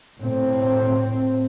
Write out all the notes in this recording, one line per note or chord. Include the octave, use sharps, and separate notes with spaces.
A2 C4